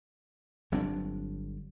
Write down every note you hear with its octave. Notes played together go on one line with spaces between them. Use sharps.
G1 F#3 C4 D4